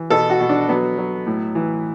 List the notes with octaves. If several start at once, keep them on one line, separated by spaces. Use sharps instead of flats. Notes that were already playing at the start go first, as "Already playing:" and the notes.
Already playing: E3
B2 A4
F#4
B2
D4
F#3 B3
F#3
A2
E3